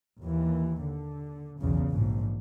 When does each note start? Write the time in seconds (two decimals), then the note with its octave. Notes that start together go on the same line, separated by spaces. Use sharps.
0.21 D#2 E3
0.82 D3
1.60 B1 E2 C#3
1.90 A#1 G#2